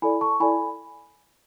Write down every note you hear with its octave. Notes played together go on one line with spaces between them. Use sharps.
E4 A4 D5 G#5 B5
A5 C#6
E4 A4 D5 G#5 B5